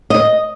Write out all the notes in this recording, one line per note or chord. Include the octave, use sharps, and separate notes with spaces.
D#5